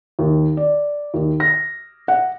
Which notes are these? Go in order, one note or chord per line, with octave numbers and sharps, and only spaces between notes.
D#2
D5
D#2
A#6
F#5